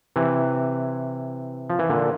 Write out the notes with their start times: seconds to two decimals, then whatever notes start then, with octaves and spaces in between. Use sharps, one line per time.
0.16 C3 E3
1.70 F3
1.79 E3
1.89 A#2 D3